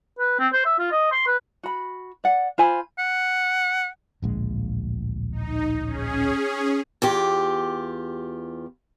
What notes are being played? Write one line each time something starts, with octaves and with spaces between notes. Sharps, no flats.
B4
C4
C5
E5
F4
D#5
C6
B4
F#4 B5
D5 F#5
F4 C5 G#5 B5
F#5
D1 A#1 G#3
D#4
C#4 G#4
E2 F4 G4